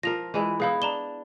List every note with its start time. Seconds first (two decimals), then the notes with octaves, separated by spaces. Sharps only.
0.03 F3 A#4 A#6 F7
0.34 E3 G#3 E4
0.60 B3 D#4 E4 G#4 F5 B5
0.82 D4 A#5 E7 G7